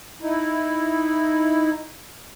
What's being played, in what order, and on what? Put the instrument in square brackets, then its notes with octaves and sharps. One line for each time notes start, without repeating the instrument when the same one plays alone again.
[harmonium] D#4 E4